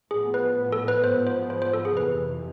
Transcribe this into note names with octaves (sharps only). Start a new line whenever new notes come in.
A2 F3 B3 G#4
B4
A4
B4
G#2 F3 B3 C5
C5
C5
C5
A4
G#4
F2 C3 E3 B4